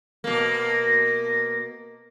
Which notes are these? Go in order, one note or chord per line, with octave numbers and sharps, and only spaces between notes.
B2 A#3